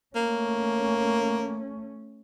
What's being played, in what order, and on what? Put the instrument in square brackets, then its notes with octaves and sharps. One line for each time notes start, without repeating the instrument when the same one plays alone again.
[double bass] A3 C#4 [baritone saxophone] A#3